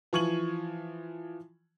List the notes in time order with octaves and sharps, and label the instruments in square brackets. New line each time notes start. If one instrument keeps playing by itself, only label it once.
[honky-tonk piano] E3 F3 C#6 G#6 D#7 F#7